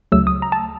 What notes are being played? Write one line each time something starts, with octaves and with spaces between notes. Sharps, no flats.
D2 C#3 F#3 A3 E6
D#6
A#5
A5